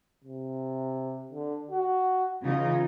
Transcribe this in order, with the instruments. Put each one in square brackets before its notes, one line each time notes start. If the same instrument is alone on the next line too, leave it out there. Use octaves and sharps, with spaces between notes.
[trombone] C3
D3
F#4
[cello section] C#3 E3 D#4 [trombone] F4